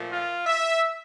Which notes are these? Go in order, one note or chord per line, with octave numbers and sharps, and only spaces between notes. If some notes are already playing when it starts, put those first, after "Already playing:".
Already playing: A#2 F3 A3
F4
E5